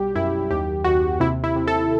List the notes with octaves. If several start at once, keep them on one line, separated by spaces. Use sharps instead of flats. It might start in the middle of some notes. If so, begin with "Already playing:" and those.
Already playing: B1 F#3 G3 G4
F#2 E4
D#2 G4
D#2 F#4
C3 E4
E4
C3
A4